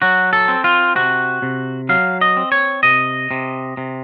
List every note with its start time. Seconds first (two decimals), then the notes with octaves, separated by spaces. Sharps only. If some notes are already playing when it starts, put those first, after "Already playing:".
0.02 F#3 F#4
0.33 A4
0.48 C4
0.64 F4
0.96 C3 F#4
1.42 C3
1.89 F#3 F5
2.21 D#5
2.37 C4
2.52 C#5
2.83 C3 D#5
3.31 C3
3.77 C3